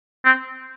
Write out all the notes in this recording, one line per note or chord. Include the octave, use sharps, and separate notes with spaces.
C4